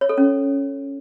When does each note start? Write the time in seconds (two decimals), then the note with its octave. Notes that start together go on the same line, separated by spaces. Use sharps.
0.01 C#5
0.09 A4
0.18 C#4